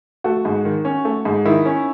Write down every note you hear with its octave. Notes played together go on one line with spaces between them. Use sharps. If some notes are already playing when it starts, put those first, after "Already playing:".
A3 F#4
G#2
D#3
C#4
A3
G#2
D#3 E4
C#4